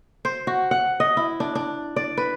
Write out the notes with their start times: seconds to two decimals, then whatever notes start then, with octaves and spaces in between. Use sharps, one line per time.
0.25 C5
0.47 F#4
0.71 F#5
1.00 D#5
1.17 E4
1.40 D4
1.55 D4
1.96 D5
2.17 B4